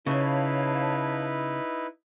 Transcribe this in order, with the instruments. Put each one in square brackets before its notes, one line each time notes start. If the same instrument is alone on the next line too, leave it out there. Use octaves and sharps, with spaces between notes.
[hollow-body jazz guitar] C#3 [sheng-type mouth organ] D#4 E4 B4 [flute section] C#5 F5 A5